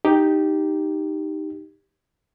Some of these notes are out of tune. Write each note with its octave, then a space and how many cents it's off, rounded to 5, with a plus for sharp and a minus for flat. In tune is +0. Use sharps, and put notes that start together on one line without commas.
D#4 +0 G4 +0